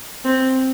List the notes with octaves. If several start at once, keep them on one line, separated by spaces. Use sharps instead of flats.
C4